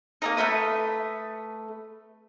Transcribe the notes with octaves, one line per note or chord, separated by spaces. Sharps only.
A#3 C4 D#4
A3 B3 B4 D#6